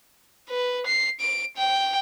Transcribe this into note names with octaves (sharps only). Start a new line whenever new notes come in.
B4
C7
D7
G5